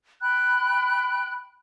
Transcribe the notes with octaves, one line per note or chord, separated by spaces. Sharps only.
G5 B5 F#6